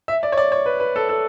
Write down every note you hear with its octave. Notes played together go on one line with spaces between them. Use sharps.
E5
D5
C#5
D5
C#5
B4
B4
A4
A4